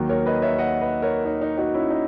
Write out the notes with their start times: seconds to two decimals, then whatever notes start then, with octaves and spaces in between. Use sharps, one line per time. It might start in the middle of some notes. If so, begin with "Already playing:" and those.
Already playing: D#2 D#3 F#3
0.09 A#4 C#5
0.26 B4 D#5
0.42 C#5 E5
0.58 D#5 F#5
0.81 B4 D#5
1.02 A#4 C#5
1.25 D#4
1.41 D#4
1.58 D#4 F#4
1.74 C#4 E4
1.90 D#4